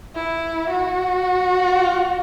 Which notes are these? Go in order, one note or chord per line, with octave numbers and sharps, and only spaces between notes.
E4
F#4